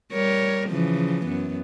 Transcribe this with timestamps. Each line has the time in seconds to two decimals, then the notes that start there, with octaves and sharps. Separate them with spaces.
0.12 G3 A#4 C#5
0.68 C#3 E3 F3
1.25 F#2 B3